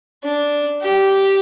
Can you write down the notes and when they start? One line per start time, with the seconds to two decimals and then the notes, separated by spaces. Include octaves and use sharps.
0.23 D4
0.82 G4